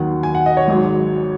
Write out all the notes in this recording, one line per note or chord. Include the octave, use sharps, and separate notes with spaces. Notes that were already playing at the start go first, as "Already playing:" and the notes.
Already playing: D#2 D#3 F#3 F#5
G#5
F#5
D#5
C#5
G#1 G#2 F#3